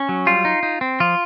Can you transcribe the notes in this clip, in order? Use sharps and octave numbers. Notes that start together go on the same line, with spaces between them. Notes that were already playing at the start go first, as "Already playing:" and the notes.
Already playing: C#4
F#3
G3 F4
D#4
D#4
C4
F3 F4